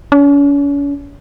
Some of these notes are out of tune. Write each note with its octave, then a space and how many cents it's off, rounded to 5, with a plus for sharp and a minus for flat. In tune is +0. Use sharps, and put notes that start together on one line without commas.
C#4 +40